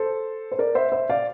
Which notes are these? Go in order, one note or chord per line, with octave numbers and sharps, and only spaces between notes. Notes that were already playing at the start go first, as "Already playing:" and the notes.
Already playing: A4 C5
C5
A#4 D5
C5 E5
C5 E5
D5 F5